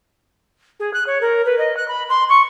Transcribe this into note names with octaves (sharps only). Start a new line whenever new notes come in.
G#4
F#6
C#5
A#4
B4
D#5
F#6
B5
C6
C#6